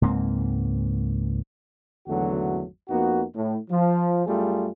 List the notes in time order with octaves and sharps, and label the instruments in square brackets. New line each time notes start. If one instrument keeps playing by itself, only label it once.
[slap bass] C#2 G#2 A#3 C4
[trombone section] G#1 E2 D3 F#3 A3 F#4
F2 A#3 B3 D#4 F#4
A2
F3
F#2 G3 A3 F4 G#4